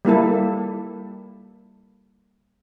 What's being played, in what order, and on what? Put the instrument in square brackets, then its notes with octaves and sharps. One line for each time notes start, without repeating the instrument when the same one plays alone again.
[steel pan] G3 A#3 E4 A4